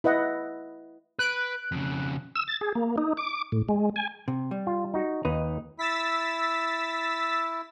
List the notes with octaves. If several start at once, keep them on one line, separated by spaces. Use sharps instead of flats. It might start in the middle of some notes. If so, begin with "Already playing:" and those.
E4 B4 D#5 F#5
B4 F#6 D7
F2 C#3
E6
A6
G#4
A#3
D#4
D6
A2
G#3
G#5
C3
G3
F4
D#4 F#4
D#2 D#4 B4
E4 E6 A6 B6